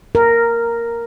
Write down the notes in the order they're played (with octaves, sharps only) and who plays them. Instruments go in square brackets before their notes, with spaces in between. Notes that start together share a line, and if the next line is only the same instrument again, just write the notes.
[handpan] A#4